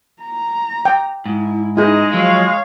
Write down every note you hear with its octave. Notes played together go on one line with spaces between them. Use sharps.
A#5
G5
G#2 E4
G#3 D#4 E4 G#4 D#5
F3 F#3 C#5 F5